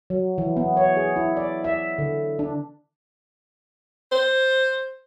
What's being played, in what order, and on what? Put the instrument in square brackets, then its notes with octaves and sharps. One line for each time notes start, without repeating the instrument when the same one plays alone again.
[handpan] F#3
E3
B3
C#5
G#4
E4
D5
E5
D3
D4
[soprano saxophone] C5